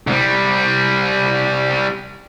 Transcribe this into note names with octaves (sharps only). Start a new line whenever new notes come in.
C2 G3